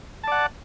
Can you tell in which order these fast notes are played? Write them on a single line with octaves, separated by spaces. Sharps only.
A5 D5 F#5